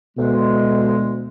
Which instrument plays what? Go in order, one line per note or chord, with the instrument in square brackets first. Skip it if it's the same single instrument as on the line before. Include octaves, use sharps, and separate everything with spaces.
[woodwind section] D2 G#3 [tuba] B2